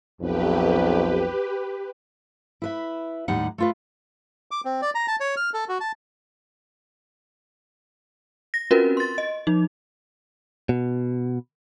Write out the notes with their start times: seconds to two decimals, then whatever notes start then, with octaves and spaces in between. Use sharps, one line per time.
0.21 B1 F2 G4 B4
2.62 E4 B4 E5
3.28 D#2 A2 G3 D#4 F#5
3.58 A3 F4 B4
4.51 D6
4.65 C4
4.82 D5
4.95 A#5
5.08 A5
5.20 C#5
5.37 F6
5.54 A4
5.69 F#4
5.80 A5
8.54 A#6
8.71 C4 C#4 F4 F#4 A#4 B4
8.97 C6 A6
9.18 D#5
9.47 F3 D#4
10.69 B2